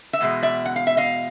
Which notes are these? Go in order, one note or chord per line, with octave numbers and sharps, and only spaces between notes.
E5
E2 B2 G#3
D5 E5
F#5
F5
E5
D#5 F5